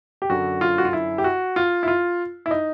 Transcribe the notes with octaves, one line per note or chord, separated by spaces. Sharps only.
G4
F#2 D3 F#3 F#4
F4
F#4
F4
E4
G4
F#4
F4
E4
F4
E4
D#4